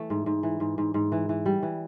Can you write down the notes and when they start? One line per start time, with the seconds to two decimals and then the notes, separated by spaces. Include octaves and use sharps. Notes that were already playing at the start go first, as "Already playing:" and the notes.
Already playing: E3 A3
0.10 G#2
0.26 G#2
0.43 E3
0.60 G#2
0.78 G#2
0.94 G#2
1.12 E3
1.29 E3
1.46 G3
1.63 E3